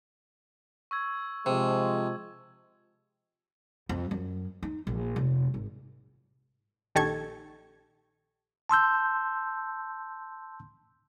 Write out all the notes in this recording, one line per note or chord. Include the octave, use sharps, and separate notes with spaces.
C#6 E6 G#6
C3 F3 G#3 E6
F2
F#2
D#4
A#1
F1
G#1
A#1 D#3 G4 A4 C#6 G#6
A5 C6 E6 G6